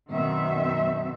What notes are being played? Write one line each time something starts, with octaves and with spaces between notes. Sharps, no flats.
F#2 B2 D#3 C4 E5